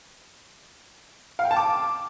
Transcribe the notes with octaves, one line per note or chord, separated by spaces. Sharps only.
F5
G5
A5
D6